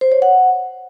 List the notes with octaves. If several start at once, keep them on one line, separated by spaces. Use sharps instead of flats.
C5
C#5
F#5